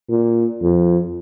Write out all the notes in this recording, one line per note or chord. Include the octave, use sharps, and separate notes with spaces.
A#2
F2